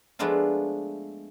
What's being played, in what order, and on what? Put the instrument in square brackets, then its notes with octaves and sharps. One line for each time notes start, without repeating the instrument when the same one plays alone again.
[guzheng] F3 G#3 A3 B3 D4 F4